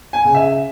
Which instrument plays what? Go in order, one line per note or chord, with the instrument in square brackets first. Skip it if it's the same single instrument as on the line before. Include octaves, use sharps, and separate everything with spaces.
[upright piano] G#5
C#3
E5